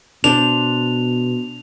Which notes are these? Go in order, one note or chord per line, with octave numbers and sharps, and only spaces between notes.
B2 D4 C5 F7